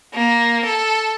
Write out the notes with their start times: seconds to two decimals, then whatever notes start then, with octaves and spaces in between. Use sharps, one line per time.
0.14 A#3
0.66 A4